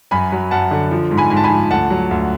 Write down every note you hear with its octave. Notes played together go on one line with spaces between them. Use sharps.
F#2 G#5 B5
F#3
F#2 F#5 A5
D3
F3
G#2
G#5 B5
G#2 G#5
A5
G#5 B5
F3
D2 F#5 A5
F#3
D2